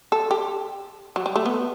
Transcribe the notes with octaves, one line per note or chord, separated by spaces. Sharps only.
A4
G4
F#3
G3
A3
B3